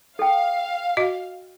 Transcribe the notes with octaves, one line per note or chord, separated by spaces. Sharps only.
A4 F5 G5
F#4 D#5